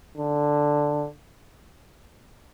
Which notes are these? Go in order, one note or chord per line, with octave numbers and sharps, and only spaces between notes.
D3